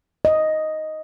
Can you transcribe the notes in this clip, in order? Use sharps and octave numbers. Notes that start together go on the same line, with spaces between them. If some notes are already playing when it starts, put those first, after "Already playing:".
D#5